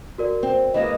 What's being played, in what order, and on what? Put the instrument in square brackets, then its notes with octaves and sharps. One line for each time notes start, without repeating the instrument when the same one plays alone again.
[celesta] F#4 A#4 D5
[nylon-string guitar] C4
[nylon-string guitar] E3 G#3 A#3 [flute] D#5